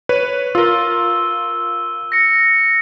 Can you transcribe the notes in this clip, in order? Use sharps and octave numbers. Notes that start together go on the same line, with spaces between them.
B4 C#5 D#7
F4 A#4 E6 G7
A#6 C#7